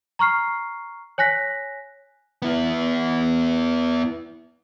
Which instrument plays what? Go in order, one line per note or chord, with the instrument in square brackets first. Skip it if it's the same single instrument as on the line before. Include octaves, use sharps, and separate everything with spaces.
[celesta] A#5 C#6 F6 C7
C#5 G#5 F#6 A#6 B6
[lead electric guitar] B3 E4